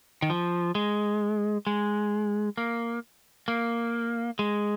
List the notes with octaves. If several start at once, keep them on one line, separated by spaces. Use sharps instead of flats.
D#3
F3
G#3
G#3
A#3
A#3
G#3